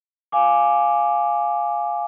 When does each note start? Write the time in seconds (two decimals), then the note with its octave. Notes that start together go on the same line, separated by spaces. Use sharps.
0.32 F5 G#5 D6